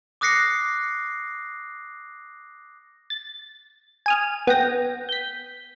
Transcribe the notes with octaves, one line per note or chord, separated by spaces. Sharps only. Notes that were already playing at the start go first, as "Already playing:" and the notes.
D6 D#6 F#6 A#6 C7 C#7
A6
G#5 D#6 F6
B3 G5 A#6
G6 B6